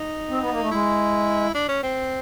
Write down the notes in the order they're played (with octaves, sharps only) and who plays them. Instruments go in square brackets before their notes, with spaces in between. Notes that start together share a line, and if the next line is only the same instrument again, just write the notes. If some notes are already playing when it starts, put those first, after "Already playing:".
Already playing: [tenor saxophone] D#4
[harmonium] C4
B3
A#3
A3
[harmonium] G#3 [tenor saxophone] E4
[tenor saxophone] D4
C#4
C4